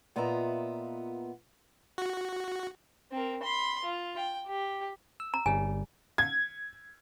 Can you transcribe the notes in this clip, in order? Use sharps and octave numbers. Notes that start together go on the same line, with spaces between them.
A#2 B3 F4 D#5 E5 A#5
F#4
C4 A#4
B5 C6
F4
G5
G4
E6
A#5
G1 G3 G#5
G#6